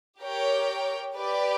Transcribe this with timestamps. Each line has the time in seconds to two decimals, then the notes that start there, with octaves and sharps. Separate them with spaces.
0.22 G4 A#4 C#5 G5
1.15 G4 B4 D5